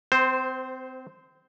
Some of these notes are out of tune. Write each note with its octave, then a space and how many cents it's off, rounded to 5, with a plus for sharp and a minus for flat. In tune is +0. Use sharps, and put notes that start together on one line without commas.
C4 -30 C5 +0